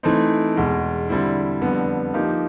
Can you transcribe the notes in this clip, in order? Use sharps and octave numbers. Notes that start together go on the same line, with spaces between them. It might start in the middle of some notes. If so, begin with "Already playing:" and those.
E3 A3 C4 D#4
E2 B2 G#3
D3 G3 C4 E4
F2 D3 G3 B3
F3 A#3 D#4 G4